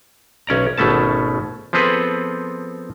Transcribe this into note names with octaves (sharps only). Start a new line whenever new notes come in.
B1 C#4 D5 A#5
G#1 B2 A3 C#4 A5
F3 B3 C4 G#4 A4 B4